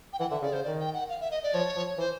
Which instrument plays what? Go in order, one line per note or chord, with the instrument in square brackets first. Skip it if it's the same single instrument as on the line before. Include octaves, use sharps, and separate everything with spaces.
[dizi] G5
[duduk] E3 [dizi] F#5
[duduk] D3 [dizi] E5
[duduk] C#3 [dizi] D5
[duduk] C#3 [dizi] C5
[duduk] D#3 [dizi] D5
[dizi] G5
F#5
F5
E5
D#5
D5
[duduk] F3 [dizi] C#5
[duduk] F3
[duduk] E3 [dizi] C5